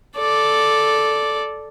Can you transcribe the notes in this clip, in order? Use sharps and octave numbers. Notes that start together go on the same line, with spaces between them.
A4 D5